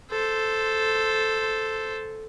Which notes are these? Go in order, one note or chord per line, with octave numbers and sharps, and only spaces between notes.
A4 C5